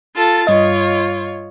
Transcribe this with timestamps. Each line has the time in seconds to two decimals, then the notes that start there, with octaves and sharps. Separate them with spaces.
0.14 F4 A4 A6
0.47 G2 F4 C#5 D#5